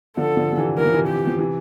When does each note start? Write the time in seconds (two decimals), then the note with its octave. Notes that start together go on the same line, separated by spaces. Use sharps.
0.17 D3 F3 A4
0.37 D3 F3
0.53 F3
0.57 C3 E3
0.78 E3 A#4
0.86 F3
0.94 C3 E3
1.08 G4
1.27 F3
1.39 C3 E3